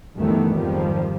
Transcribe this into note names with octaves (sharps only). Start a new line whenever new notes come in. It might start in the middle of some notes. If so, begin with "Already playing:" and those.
D2 G2 D#3 E3 A3 B3
F2 G#2 D#3 F3 G3